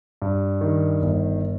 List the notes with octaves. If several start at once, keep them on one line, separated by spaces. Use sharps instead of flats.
G2
D#3
G1